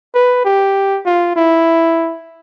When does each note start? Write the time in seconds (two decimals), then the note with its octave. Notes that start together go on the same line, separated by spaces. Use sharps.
0.14 B4
0.45 G4
1.06 F4
1.36 E4